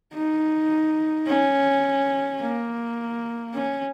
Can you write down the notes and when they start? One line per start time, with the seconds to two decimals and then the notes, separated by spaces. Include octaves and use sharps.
0.14 D#4
1.27 C#4
2.40 A#3
3.53 C#4